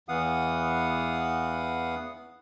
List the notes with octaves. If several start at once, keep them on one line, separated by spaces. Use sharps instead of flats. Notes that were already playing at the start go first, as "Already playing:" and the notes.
E2 E3 B3 F5 F#5 D#6